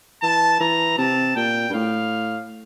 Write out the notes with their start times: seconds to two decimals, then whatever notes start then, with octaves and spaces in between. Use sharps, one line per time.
0.22 E3 A5
0.60 E3 A#5
0.98 C3 A5
1.36 A#2 G5
1.69 G2
1.73 A2 F5